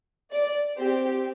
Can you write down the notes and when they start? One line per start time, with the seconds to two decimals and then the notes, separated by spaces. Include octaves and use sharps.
0.31 D5
0.76 C4 G4 C5